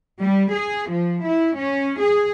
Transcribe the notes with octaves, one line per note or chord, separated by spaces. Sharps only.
G3
G#4
F3
E4
C#4
G#4